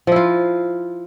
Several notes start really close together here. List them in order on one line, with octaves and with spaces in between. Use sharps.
F3 E4 F4